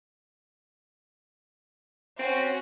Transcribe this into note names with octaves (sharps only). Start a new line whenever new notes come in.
C4 C#4 F#4